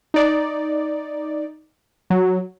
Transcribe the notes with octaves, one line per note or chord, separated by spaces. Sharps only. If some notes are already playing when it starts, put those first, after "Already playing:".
D#4 D5
F#3